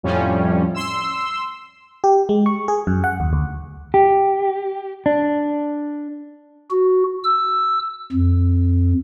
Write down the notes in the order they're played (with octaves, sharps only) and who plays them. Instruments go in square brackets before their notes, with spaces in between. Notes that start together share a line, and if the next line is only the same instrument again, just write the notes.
[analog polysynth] F2 A2 F3 G3 C#4
C6 E6
[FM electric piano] G4
G#3
C#6
G#4
F#2
F#5
D#2
D2
[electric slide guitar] G4
D4
[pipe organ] F#4
E6
F2